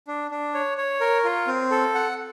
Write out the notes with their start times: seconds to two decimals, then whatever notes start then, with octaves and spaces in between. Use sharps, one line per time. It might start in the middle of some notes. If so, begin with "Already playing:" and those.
0.07 D4
0.31 D4
0.54 C#5
0.78 C#5
1.01 A#4
1.24 F4
1.47 C4
1.71 A4
1.95 F#5